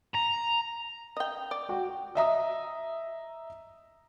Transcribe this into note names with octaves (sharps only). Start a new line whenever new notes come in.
A#5
D#5 G5
D5
F#4 G5
D#5 E5 A#5 D#6